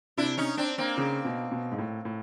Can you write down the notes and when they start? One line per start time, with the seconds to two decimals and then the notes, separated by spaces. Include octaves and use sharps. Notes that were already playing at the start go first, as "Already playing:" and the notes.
0.17 C3 D4 E4
0.37 C#4 D#4
0.57 C4 D4
0.78 A#3 C4
0.97 C#3
1.25 B2
1.52 B2
1.72 G#2
1.78 A2
2.05 A2